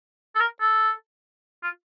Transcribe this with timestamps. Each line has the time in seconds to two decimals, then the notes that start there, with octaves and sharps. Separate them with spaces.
0.35 A4
0.40 A#4
0.61 A4
1.63 F4